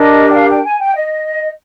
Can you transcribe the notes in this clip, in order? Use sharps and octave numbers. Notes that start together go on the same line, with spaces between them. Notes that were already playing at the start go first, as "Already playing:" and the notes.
Already playing: D4 G4 A#4 D#5
G5
F5
G5
G#5
G5
D#5